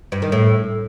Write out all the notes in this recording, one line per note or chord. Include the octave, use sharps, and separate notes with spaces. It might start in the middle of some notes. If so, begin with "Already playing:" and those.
G2
D#3
A2